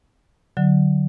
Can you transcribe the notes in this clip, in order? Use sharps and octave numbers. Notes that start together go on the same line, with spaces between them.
D3 F#3